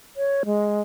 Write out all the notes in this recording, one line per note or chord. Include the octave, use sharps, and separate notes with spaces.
C#5
G#3